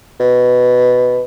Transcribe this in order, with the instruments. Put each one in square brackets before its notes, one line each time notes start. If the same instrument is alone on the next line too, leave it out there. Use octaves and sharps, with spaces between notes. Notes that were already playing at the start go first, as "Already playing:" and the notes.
[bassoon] B2